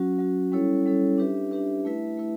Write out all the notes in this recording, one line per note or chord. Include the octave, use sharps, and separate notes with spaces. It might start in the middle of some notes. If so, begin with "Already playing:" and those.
Already playing: F#3 C#4 F#4
F#3 C#4 F#4
G3 C#4 E4 A4 C#5
G3 C#4 E4 A4 C#5
D4 G4 B4 E5
D4 G4 B4 E5
A3 E4 B4 E5
A3 E4 B4 E5